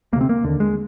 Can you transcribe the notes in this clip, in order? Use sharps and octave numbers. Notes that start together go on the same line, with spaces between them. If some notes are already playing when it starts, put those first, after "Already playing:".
D2 C3 A#3
C4
A#3
D#2 D3
G#3